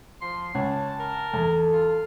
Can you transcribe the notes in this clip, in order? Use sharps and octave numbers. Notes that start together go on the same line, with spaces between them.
F3 C6
C#2 C#5 A5
A#4
E2 A4
F4